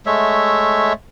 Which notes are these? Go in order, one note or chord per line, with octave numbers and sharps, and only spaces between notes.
G#3 A3 C#5 E5